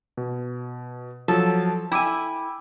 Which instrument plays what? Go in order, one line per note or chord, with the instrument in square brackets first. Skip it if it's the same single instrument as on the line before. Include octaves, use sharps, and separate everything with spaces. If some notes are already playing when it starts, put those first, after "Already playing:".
[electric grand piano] B2
[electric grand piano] F3 F#3 [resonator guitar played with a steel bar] A4
[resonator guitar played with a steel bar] E4 G#5 [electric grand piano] G5 D6 E6